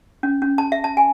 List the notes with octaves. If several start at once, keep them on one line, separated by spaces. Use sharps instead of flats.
C#4
C#4
A5
E5
A5
G#5